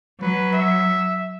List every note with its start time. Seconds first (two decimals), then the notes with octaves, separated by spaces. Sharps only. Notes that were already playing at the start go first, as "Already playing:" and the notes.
0.21 F#3 B4
0.53 E5